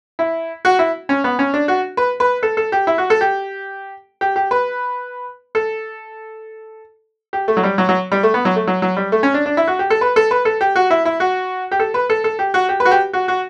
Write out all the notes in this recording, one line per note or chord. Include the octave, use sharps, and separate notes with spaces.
E4
F#4
E4
C#4
B3
C#4
D4
F#4
B4
B4
A4
A4
G4
E4
F#4
A4
G4
G4
G4
B4
A4
G4
A3
F#3
G3
F#3
F#3
G3
A3
B3
F#3
A3
F#3
F#3
G3
A3
C#4
D4
D4
E4
F#4
G4
A4
B4
A4
B4
A4
G4
F#4
E4
E4
F#4
G4
A4
B4
A4
A4
G4
F#4
G4
B4
F#4
G4
F#4
F#4